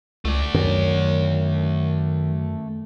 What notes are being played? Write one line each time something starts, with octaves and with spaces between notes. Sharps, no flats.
C#2 A3 D5
F#2 D#3